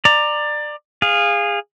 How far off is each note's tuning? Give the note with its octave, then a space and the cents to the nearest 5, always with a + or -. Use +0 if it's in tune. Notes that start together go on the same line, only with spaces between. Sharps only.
D5 +20 A#5 +0
G#4 -20 F5 +0